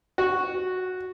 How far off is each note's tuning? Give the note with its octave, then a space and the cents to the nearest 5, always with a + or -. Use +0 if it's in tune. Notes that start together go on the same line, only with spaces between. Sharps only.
F#4 -5